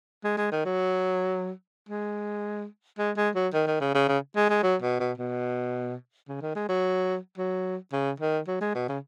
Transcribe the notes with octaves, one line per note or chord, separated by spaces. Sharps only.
G#3
G#3
D#3
F#3
G#3
G#3
G#3
F#3
D#3
D#3
C#3
C#3
C#3
G#3
G#3
F#3
B2
B2
B2
C#3
D#3
G#3
F#3
F#3
C#3
D#3
F#3
G#3
B2
C#3